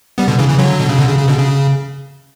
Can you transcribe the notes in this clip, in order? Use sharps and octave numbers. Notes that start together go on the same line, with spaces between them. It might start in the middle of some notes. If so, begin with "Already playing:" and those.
G3 B3
B2 D3
C#3 E3
C#3 E3
D3 F#3
B2
C#3
B2 D3
C#3
C#3
B2 D3
C#3